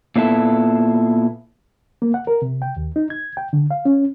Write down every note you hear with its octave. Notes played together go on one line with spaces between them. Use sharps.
A#2 B3 E4 A4
A#3
F#5
A#4
C3
G5
D#2
D#4
G#6
G5
D3
F5
C#4